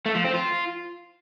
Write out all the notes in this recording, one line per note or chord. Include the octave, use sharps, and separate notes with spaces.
A3
F3
C4
F4